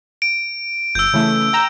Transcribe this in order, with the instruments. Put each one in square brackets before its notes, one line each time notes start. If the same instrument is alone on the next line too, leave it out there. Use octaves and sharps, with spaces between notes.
[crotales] D7
[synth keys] G1 [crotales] E6 G6
[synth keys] C#3 E3 A3
G5 A#5 E6